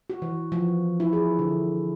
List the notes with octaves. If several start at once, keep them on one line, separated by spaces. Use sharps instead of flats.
F#4
E3
F3
E4
G#4
D3